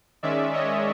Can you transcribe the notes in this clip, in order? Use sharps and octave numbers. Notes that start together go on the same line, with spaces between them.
D#3 G#3 C#4 D5 E5
C#5 D#5